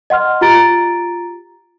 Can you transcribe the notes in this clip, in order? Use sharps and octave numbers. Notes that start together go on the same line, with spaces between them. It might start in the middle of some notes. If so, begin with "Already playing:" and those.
D#5 F#5 C6 F6
F4 G4 A#5 A6 D7